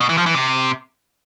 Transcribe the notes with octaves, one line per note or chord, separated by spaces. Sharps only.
B2
E3
F3
E3
C3